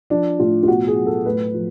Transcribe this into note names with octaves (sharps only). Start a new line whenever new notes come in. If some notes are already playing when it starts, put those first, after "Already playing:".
F3 D4
A2 F4
F4
B2 F#4
G#4
F#3
A4
A2 B4
F3